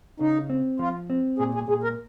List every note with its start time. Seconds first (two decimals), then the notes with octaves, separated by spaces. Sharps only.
0.20 C#3 D#4
0.50 C4
0.79 F3 F4
1.10 C4
1.39 A#2 G#4
1.54 G#4
1.68 A#2 G#4
1.83 A#4